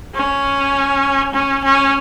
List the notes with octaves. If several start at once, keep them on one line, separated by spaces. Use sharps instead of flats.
C#4
C#4
C#4